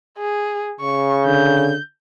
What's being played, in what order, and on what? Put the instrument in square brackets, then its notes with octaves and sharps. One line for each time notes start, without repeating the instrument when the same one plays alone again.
[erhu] G#4
[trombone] C#3 [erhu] C#6
[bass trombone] D3 [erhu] G6